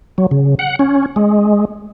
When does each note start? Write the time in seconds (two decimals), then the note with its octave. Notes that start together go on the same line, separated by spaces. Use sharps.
0.18 F#3
0.31 C#3
0.59 F#5
0.79 C#4
1.16 G#3